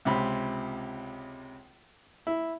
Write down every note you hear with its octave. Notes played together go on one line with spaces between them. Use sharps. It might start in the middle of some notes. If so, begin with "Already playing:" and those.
C#2 C3 B5
E4